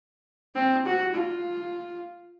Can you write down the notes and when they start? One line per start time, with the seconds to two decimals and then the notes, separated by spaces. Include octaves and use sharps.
0.55 C4
0.86 F#4
1.15 F4